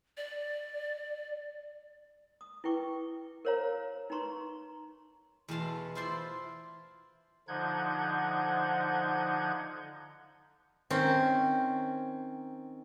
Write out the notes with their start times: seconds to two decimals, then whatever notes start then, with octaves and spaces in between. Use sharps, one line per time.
0.17 D5
2.41 D#6
2.64 E4 B4 G5 C#6 D6
3.45 A#4 C5 C#5 F5 A#5
4.10 D#4 B4 A#5 C6 C#6
5.48 E2 B2 A5 C6
5.95 E4 F4 C5 D5 C6
7.48 D3 F3 D#4 F#5 G6 G#6
10.90 D#3 C4 C#4